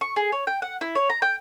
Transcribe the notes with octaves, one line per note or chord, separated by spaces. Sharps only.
C#6
G#4
C#5
G5
F#5
E4
C#5
A#5
G5